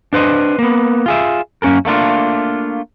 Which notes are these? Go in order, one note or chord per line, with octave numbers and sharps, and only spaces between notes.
D4 B4 C5 D#5
A#3 B3
F4 G#4 E5
F#2 A#3 C#4 A4 A#4
A3 A#3 D4 F4